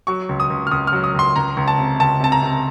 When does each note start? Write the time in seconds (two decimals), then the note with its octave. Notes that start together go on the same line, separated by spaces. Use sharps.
0.07 F#3 C#6
0.29 C#2
0.40 D#6
0.50 C#2
0.67 F6
0.71 C#2 D#6
0.87 F6
0.93 F#3
1.04 D#6
1.14 C#2 C6
1.36 C#2 A#5
1.57 C#2
1.68 A5
1.78 C3
2.00 C#2 A5
2.21 C3 A5
2.32 A#5
2.42 C3